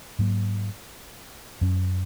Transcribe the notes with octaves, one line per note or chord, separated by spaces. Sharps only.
G#2 F#3 A#3
F#2 F#3 C#4